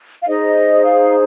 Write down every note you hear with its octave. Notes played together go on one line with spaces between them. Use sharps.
F5
D#4 G#4 C5 D#5
F5